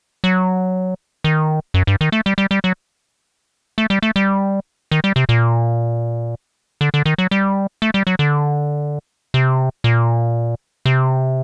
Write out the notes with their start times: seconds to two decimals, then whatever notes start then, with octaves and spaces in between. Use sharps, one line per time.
0.24 F#3
1.24 D#3
1.74 F#2
1.87 G2
2.01 D#3
2.12 A3
2.26 G3
2.38 G3
2.51 G3
2.64 F#3
3.78 A3
3.90 G3
4.02 A3
4.16 G3
4.91 D#3
5.04 G3
5.16 C3
5.29 A#2
6.81 D3
6.94 D3
7.06 D#3
7.18 F#3
7.31 G3
7.82 A3
7.94 G3
8.07 F#3
8.19 D3
9.34 C3
9.84 A#2
10.86 C3